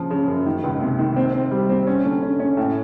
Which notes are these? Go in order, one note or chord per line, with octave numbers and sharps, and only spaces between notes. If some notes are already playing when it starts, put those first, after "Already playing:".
Already playing: C#3 F3
C#3
F#2
D#3
C#2
C3
D#3
C4
C4
G3
C4
C#4
D3
C#4
C#4
A2